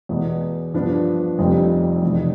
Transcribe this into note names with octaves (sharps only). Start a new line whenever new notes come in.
E2 B2 B3
G2 F3 B3 D4
F1 F2 C3 G3 C4
F1 E2 B2